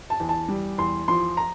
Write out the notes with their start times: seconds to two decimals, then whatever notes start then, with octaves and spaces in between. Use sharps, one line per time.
0.10 A5
0.20 E2
0.29 A5
0.48 G3
0.78 E2 C6
1.08 F3 C6
1.37 A#5